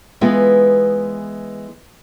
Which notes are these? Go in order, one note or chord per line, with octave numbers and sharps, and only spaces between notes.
E3 G#3 B3 E4 F4